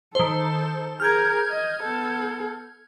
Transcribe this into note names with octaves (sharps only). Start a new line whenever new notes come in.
D#3 A4 C5
G#4 A#4 F6 G6 G#6
D#5
B3 A4